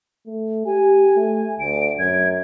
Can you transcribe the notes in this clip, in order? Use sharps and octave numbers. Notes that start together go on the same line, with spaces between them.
A3
G4 G#5
A3
D2 D7
F#2 G#6